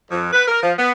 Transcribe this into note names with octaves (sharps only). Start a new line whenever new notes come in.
F2
B4
A#4
F3
B3